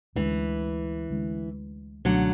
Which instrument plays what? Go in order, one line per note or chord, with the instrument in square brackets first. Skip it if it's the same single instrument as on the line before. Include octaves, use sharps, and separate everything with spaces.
[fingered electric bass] D2 D3 G#3 C#4 [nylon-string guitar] E3
[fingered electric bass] D2 D3 G#3 C#4
[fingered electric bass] C#2 B2 A3 C#4 [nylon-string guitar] D3 F#3